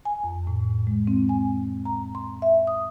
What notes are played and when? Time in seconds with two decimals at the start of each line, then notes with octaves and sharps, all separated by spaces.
0.05 G#5
0.24 F2
0.47 A2
0.87 G#3
1.07 C4
1.29 G#5
1.85 A#5
2.15 C6
2.42 E5
2.67 D#6